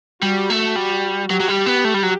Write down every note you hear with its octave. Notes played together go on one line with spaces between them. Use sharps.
G3 F#4
A3
G3
F#3 G4
F#3
G3
B3
A3
G3
F#3